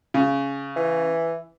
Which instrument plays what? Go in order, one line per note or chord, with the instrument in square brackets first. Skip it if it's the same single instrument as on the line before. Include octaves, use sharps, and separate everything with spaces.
[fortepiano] C#3
[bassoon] E3